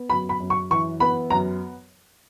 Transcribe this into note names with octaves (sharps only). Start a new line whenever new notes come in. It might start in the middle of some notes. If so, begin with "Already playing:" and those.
Already playing: B3
F#2 B5
B5
F#2
C#6
E3 C#6
B3 B5
F#2 A#5